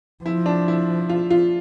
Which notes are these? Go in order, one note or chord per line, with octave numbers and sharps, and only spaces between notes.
F3 E4
D4
E4
F4
F4